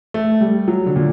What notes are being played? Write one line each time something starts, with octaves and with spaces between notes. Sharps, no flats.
A3
G3
F#3
D3
A#2